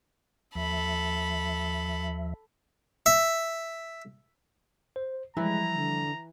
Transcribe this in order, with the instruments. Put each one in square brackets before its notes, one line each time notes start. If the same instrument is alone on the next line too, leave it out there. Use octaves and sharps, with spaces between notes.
[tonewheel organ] D#2 F3 E5 [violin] A4 B5
[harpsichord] E5
[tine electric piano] C5
[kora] E3 E4 B4 [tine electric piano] F3 G3 [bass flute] G#3 [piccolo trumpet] A#5
[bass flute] D3